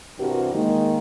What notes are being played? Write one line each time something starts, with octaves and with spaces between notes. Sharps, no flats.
G2 C3 E3 F#4 G4 A#4
D#3 G#3 A#3